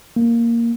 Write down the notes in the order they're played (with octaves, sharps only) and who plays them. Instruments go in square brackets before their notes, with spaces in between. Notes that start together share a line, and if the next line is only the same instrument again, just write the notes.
[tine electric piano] A#3